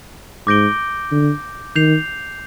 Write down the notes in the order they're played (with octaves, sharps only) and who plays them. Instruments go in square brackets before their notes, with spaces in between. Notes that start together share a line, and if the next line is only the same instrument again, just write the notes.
[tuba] G#2 [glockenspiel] D6 G6 A#6 D7 G7
[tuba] D3
[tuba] D#3 [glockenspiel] G6 C7 F7